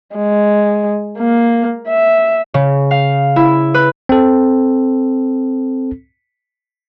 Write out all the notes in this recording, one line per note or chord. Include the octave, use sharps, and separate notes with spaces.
G#3
A#3
E5
C#3
F5
E4
B4
C4 A4